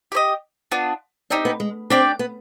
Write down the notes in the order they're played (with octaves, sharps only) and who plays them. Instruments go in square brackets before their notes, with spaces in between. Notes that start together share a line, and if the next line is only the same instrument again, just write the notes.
[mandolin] G4 C5 D#5
B3 D4 F4
[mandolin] C4 D#4 G4 [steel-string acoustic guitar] D4
[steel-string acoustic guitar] B3
G#3
[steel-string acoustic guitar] C4 [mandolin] D4 G4 D5 G5
[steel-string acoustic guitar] B3